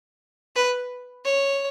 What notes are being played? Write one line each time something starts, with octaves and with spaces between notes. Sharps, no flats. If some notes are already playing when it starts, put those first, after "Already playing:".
B4
C#5